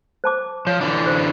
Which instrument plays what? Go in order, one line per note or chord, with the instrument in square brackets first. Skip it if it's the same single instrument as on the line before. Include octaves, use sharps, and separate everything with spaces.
[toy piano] C5 A5 D6
[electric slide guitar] F3 [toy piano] C#5
[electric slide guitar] D3 E3 D4
[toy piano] C5